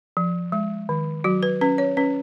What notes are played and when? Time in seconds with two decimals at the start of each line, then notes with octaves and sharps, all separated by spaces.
0.17 F3
0.52 G#3
0.89 D#3
1.24 F#3 F#4
1.43 B4
1.61 C#4 B4
1.78 C#5
1.97 C#4 B4